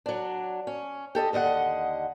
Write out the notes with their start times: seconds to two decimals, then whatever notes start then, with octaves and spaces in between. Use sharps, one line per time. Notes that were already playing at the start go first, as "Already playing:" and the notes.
0.06 F#3 D4
0.67 C#4
1.15 G4 A4 D#5
1.33 D#2 D3 D#5 F#5